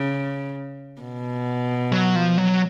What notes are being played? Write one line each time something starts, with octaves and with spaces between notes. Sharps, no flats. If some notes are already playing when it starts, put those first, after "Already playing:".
Already playing: C#3
B2
F#3
F3
F#3